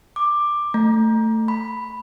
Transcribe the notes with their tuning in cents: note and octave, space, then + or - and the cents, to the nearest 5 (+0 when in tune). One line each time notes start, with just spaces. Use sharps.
D6 +10
A3 +15
B5 +0